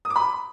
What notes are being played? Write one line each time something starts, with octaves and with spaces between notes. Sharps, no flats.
D#6
D6
B5